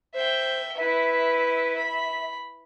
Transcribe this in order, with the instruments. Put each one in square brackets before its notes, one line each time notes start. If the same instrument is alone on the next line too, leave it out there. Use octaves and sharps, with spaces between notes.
[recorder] C5 [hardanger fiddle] E5 G5
[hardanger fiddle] E4 B4 [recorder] E5
[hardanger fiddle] B5